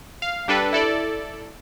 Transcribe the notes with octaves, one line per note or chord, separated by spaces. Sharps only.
F5
G3 D4 A4 B4
E4 A4 D5